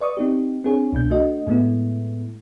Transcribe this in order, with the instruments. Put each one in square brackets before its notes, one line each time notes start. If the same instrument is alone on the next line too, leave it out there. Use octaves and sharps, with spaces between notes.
[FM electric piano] B4 D5 C#6 D#6
C4 D#4 G4
C4 D4 G#4 C#5
C2 B2 D4 G6
A3 D4 F#4 D#5
A2 G#3 A3 B3 E4